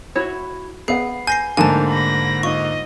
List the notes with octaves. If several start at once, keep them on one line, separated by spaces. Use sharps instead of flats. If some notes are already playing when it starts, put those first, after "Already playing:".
E4 F#4 C#5
B3 G#4 F5 F#5 C7
G#5 G6 A#6 C7
G#2 D3 F3 A3 A#3 D#4 G#5 A5
B5 A#6
D#4 F4 D#5 C#6